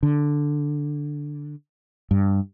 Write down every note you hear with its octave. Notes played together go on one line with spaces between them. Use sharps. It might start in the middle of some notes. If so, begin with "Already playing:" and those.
D3
G2